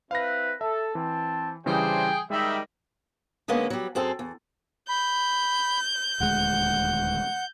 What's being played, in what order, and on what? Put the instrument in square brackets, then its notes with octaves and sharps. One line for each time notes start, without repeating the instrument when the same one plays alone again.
[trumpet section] C4 E4 B4 [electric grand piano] F5 A#6
[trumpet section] A4 [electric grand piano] E5
[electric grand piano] E3 [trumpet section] C4 A5
[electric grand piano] C#3 E3 G3 [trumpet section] D4 E4 C5 [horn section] G#4 G5
[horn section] D#3 G3 [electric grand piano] G#3 [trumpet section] E5
[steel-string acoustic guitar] D3 G#3 A#3 B3 C#4
F#3 G3
F#2 C4 G#4 A4
E2
[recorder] B5 [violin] G6
[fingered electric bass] D#1 D2 G#3 [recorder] F#5